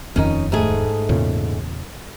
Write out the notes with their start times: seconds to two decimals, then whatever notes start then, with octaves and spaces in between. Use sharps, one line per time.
0.16 D#1 F2 D#3 C#4 D#4
0.52 G#2 A3 G#4
1.09 E2 A#2 C#3